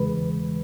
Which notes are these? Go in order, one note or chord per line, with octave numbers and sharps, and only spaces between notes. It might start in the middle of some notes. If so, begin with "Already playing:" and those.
Already playing: E2 C#3 E3 G#3 B4